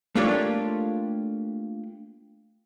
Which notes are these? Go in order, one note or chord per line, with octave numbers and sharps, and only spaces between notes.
A3 A#3 D4 F4 G4 C#5